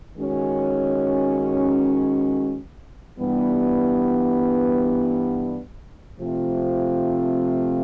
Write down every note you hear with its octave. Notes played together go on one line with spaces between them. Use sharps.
D#3 G#3 C#4 F#4
G2 E3 G3 B3
C3 F3 A3 C4 F4